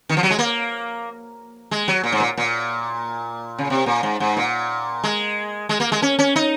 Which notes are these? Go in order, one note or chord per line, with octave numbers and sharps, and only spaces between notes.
D#3
F3
F#3
G#3
A#3
G#3
F#3
A#2
G#2
A#2
A#2
C#3
C3
A#2
G#2
G#2
A#2
G#3
G#3
A#3
G#3
C#4
C#4
D#4